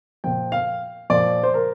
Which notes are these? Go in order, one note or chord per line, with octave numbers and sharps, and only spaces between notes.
A#2 F3 G5
F5
A#2 F3 D5
C5
A#4